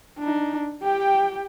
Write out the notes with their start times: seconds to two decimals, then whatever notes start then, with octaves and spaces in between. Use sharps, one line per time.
0.19 D4 D#4
0.82 G4 G5